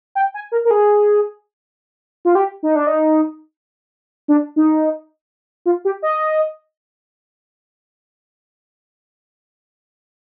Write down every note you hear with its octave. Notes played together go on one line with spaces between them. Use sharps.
G5
G#5
A#4
A#4
G#4
F4
G4
D#4
D4
D#4
D4
D#4
F4
G4
D#5